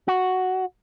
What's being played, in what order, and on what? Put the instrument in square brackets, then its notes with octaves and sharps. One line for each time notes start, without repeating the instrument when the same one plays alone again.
[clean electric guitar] F#4